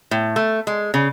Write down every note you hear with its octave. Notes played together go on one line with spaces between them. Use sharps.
A2
A3
G#3
C#3